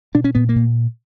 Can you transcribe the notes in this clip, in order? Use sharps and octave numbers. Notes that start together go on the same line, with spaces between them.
B2 D4
C#4
A#2 B3
A#3
A#2